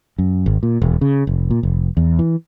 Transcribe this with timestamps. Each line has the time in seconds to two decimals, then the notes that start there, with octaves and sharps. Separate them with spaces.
0.18 F#2
0.46 G#1
0.63 A#2
0.82 E1
1.01 C#3
1.27 F1
1.50 A#2
1.63 F1
1.97 E2
2.19 E3